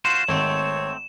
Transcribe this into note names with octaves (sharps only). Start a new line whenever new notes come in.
F4 F#4 C5 E7
G#1 A3 C4 C#5